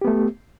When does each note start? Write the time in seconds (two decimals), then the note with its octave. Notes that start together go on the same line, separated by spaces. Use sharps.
0.02 G4
0.05 B3
0.08 A3